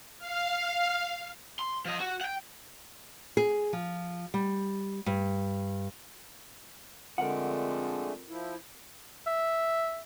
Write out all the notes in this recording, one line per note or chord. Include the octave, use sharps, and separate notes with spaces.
F5
C6
F3 D#5
F#4
F#5 G5
G#4
F3
G3
G2
F2 D3 G#3 A3 A#4 F#5
F3 E4
E5